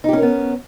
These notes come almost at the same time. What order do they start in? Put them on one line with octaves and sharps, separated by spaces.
D#4 G4 C#4 A#4 B3